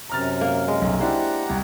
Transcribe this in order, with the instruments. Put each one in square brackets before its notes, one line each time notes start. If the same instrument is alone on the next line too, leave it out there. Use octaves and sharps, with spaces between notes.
[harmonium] F#2 C3 [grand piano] A#5 F6 A6
[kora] A#3
G#3
[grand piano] B1
[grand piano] D4 E4 C5 [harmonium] G4 F#5 A#5
[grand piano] C2